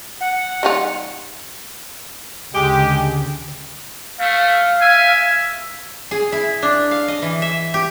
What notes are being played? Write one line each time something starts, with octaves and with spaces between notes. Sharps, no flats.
F#5
G3 D#4 F4
D2 C#3 G#3 G4
A3 F5
E5 G#5
G#4
E4
D4
F5
D#5
E3
E5
G4